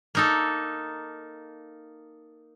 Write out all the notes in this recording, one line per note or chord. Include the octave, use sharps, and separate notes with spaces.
A#3 D#4 A4